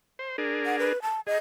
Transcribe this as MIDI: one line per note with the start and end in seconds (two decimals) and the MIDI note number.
0.19 0.37 72
0.38 0.93 62
0.38 0.93 68
0.38 0.93 70
0.66 0.79 78
0.79 1.02 71
1.02 1.20 81
1.27 1.38 68
1.27 1.37 75